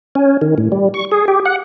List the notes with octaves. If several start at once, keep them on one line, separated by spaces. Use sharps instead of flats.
C#4
D#3
A2
G3
C#6
G#4
G4
F#5